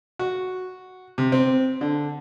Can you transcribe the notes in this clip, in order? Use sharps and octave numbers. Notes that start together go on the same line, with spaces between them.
F#4
C3
C4
D3